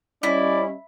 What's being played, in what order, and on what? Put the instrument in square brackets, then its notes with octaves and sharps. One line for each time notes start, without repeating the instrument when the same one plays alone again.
[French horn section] G3 C#4 D#5 [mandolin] E4 [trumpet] D5